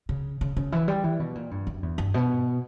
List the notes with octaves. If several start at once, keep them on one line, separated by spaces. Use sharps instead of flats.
C#3
C#3
C#3
E3
G3
E3
B2
A#2
G2
F#2
E2
G2
B2